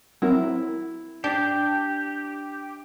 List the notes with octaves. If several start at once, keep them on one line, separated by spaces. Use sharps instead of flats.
F#3 C4 E4 A#4
D4 G4 G6